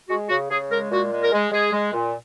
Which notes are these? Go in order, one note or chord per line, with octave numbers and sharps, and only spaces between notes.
G#3 F#4
C#3 F#4
C#3 G#4
G#3 A#4
A#2 F#4
G#3
A#4
G#3
G#3 G#4
G#3
A#2